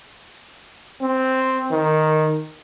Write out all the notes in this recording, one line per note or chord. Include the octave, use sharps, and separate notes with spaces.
C4
D#3